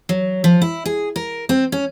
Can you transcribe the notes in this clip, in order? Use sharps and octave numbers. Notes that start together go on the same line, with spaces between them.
F#3
F3
E4
G#4
A#4
C4
C#4